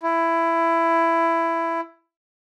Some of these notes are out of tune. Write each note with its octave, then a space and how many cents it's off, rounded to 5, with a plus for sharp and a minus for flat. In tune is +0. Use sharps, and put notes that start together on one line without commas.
E4 +15